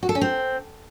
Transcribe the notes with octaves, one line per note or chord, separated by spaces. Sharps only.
F#4
A4
C#4
C4